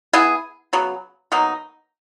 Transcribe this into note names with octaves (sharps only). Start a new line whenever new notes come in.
B3 E4 G#4
C#3 F#3 B3
B2 F#3 A#3 D#4